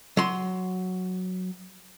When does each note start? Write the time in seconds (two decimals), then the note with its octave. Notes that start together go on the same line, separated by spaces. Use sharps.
0.17 F#3 C6